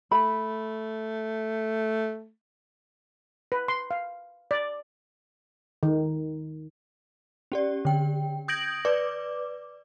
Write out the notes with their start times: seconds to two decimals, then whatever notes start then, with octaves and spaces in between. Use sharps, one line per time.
0.12 A3 B5
3.52 B4
3.68 C6
3.91 F5
4.51 D5
5.83 D#3
7.52 C#4 G4 D5
7.85 D3 G5
8.48 D#6 G6 G#6 A#6 D7 F#7
8.85 B4 D5 D6